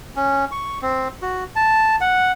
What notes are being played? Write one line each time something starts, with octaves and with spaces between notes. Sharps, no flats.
C#4
C#6
C4
F#4
A5
F#5